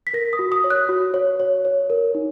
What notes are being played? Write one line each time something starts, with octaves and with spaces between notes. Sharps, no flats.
B6
A#4 A#6
D#6
F#4
D#6
C#5
F#6
F#4
C#5
C#5
C#5
A#4
D#4